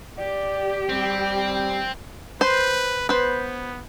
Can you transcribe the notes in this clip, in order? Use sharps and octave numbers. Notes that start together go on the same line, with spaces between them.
G4 D5
G3 C4
B4 C5
B3 B4 C5